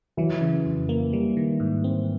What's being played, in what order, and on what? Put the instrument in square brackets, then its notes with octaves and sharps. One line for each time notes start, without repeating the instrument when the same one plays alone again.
[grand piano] E3 [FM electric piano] F#3
[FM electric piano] C#3
F2
A#3
G3
D#3
G#2
C4